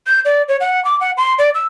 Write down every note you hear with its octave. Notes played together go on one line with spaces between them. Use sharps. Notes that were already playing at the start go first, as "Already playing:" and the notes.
G6
D5
C#5
F#5
D6
F#5
C6
D5
E6